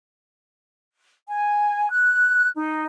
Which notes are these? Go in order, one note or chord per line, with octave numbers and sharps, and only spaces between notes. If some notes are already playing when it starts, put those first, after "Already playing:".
G#5
F#6
D#4